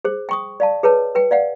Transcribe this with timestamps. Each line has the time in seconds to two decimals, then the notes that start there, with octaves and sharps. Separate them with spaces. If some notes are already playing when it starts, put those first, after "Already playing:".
0.05 G#4 C5
0.29 G5 C#6 D#6
0.60 D5 F5 A5
0.83 G#4 B4 C#5 A5
1.15 B4 G5
1.31 D5 F5 F#5